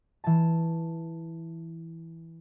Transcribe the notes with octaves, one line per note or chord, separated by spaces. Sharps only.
E3 A5